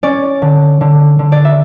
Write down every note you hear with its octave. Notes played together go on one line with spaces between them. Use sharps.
C#4 D5
D3
D3
D3
D5
E5